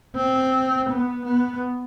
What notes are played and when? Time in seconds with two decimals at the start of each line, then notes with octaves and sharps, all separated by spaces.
0.15 C4
0.89 B3
1.25 B3